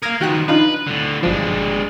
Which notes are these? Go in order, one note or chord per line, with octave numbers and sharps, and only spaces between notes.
A#4 F5 D#6 G#6 A#6
D#3 F3 F#4 G5 F#6
D4 D#4 F4 B4
A2 D3
G1 F3 G#3 D4